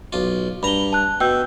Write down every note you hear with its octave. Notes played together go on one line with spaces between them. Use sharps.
B1 F4
G2 A#5 B5 G7
A5 F#6
B2 G5 E6 G6